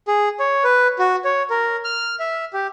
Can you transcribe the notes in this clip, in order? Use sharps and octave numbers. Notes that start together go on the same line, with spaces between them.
G#4
C#5
B4
F#4
C#5
A#4
F6
E5
G4